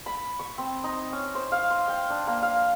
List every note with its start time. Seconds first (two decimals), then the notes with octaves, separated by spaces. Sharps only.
0.06 B5
0.39 C#6
0.58 C4
0.84 D#4
1.12 C#4
1.35 C5
1.52 F5
1.70 C6
1.88 G5
2.10 D4
2.27 A#3
2.42 F5